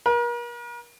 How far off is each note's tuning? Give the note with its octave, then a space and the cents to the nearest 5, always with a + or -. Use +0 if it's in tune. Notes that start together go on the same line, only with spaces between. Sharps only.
A#4 +40